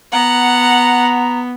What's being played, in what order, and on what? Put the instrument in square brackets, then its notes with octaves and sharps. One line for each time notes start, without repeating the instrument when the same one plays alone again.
[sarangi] B3 [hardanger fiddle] F#5 [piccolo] A#5